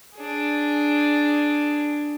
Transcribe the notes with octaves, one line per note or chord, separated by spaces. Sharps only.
D4 G#4